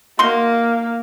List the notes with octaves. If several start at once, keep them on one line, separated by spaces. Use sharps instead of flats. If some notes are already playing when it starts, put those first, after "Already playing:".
A#3 D#4 F#4 C6